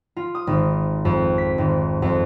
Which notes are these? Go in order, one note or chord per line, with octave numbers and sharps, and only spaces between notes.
F4
D#6
G#1
F2
B6
G#1
F2